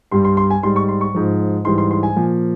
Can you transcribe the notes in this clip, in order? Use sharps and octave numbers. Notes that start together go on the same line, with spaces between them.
G2 G3 C6
C6
C6
G#5
G#2 G3 C6
C#6
C6
C#6
G#2 F3
G#2 E3 G3 C6
C6
C6
G#5
A#2 F3